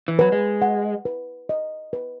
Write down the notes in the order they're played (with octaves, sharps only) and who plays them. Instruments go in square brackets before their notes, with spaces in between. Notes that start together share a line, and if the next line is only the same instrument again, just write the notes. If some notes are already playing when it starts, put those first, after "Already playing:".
[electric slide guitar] E3
[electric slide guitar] F#3 [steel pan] B4
[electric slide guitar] G#3
[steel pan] F#5
B4
D#5
B4